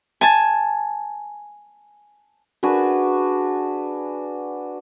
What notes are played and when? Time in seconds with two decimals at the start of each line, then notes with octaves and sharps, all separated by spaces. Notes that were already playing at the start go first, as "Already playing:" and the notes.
0.21 G#5 A5
2.63 D4 F#4 G#4 B4